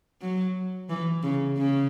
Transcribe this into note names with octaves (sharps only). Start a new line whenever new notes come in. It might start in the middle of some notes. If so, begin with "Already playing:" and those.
F#3
E3
C#3
C#3